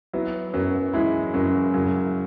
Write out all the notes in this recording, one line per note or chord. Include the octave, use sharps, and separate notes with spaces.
F#3 B3 E4
F#2 F#3 B3
E3 G#3 E4
F#2 C#3 F#3
F#2 C#3 F#3